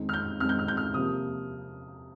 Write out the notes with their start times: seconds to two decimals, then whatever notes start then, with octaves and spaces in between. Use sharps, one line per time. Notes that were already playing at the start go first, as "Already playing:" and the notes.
Already playing: F2 D#3 G#3
0.09 F6
0.14 G6
0.40 F2 D#3 G#3 F6
0.49 G6
0.59 F6
0.68 G6
0.77 F6
0.94 C3 F3 A#3 D#6